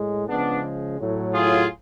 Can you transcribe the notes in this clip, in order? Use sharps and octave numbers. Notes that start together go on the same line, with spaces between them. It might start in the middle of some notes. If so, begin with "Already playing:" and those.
Already playing: A2 G#3
C#3 F3 G#3 B3 D4
A2 F#3
F4 G#4